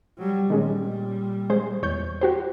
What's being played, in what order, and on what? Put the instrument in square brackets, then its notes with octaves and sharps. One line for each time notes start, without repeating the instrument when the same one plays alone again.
[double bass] F#3 G3
[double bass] A#2 G3 [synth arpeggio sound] D#3 G#3 C#4
[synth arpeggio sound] G#3 C5
E2 C#5 G6
F#4 G4 C5